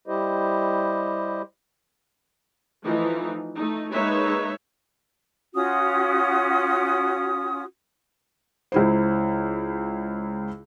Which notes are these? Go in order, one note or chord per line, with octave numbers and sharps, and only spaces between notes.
G3 E4 G4 C5 D#5
E3 F3 A3 D#4 F4
A3 D#4
G#3 A#3 D#4 B4 C#5 E5
C#4 F4 F#4 D#6
C#2 E4 C5